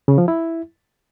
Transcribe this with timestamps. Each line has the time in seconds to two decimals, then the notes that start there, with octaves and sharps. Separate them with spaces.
0.08 C#3
0.18 F3
0.28 E4